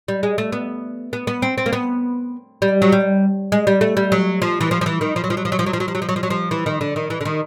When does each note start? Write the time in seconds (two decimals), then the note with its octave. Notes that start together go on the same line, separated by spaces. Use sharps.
0.08 G3
0.23 G#3
0.38 A3
0.52 B3
1.13 B3
1.27 B3
1.42 C4
1.58 C4
1.66 A#3
1.73 B3
2.62 G3
2.82 F#3
2.92 G3
3.52 G#3
3.67 G3
3.81 A3
3.97 G3
4.12 F#3
4.42 F3
4.61 E3
4.71 F3
4.81 F3
4.86 E3
5.01 D#3
5.16 F3
5.24 F#3
5.30 F3
5.37 F#3
5.45 F3
5.52 F#3
5.59 F3
5.66 F#3
5.73 F3
5.80 F#3
5.88 F3
5.95 F#3
6.02 F3
6.09 F#3
6.16 F3
6.23 F#3
6.30 F3
6.51 E3
6.66 D#3
6.81 D3
6.96 D#3
7.10 E3
7.21 D3
7.25 D#3